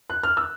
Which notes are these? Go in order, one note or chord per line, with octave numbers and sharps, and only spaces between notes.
F#6
F6
E6